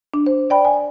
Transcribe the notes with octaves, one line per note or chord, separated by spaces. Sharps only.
D4
C5
D5 G5 B5
G#5